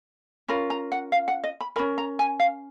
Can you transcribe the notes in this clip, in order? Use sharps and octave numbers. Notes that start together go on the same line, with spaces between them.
C#4 F4 A#4 B5
A#5
F#5
F5
F#5
D#5
B5
C#4 F4 A#4 B5
A#5
G#5
F5